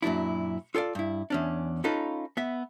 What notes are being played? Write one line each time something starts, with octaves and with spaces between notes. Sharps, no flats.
F#2 A#2 F#3 D4 E4
F4 A4 C#5 D5 F5
G2 E4
E2 C#4 D4
C#4 D#4 F4 A4 B4
B3 E5